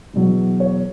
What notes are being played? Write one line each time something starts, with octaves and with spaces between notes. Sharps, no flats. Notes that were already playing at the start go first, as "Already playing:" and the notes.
E2 B2 F#3
C#5